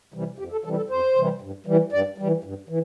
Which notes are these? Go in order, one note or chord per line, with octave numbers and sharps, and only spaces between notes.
C3 E3 G3
F2 G4
A4
C3 E3 G3 A4
A4
F2 C5
C3 E3 G3
G2
E3 G3
G2 D5
E3 G3
G2
E3